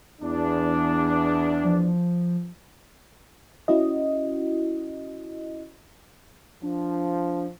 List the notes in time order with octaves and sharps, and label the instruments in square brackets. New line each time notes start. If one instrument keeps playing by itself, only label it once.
[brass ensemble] E2 D4
[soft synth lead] F3
[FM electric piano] C#4 E4 F#4 D#5
[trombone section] F3 [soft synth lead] D4